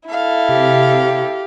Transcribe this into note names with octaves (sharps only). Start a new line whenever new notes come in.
E4 A4 F5
C3 G4